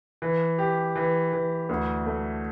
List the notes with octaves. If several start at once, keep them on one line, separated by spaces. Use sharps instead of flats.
E3
G4
E3
E3
D2
A3